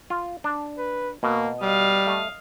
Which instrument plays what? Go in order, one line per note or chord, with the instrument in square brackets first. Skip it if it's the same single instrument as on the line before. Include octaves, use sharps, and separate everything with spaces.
[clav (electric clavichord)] F4
D4
[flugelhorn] B4
[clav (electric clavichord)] B2 [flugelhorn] A#3
[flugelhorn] G3 [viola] D#5 F5
[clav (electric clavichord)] A3